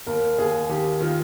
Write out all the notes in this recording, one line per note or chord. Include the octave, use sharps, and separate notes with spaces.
D#2 A#4
D#2 G#4
D#3 G4
D#3 F4